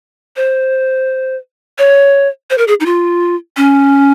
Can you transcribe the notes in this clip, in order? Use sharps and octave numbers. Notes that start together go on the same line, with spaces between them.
C5
C#5
C5
A#4
G#4
D#4
F4
C#4